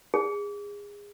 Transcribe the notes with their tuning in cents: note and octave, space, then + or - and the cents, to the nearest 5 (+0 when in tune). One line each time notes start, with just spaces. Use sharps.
G#4 -25